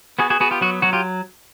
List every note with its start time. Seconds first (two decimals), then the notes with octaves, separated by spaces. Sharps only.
0.19 B3 F#4 G#4
0.30 F#4 G#4
0.40 B3 F#4 G#4
0.51 F4 G4
0.61 F#3 F#4
0.82 F#3 F#4
0.93 F4 G4